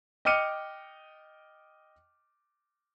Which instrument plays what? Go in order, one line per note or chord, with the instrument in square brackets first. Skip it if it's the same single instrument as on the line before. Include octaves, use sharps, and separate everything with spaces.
[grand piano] D#5 G5 D6 F6 C#7 D#7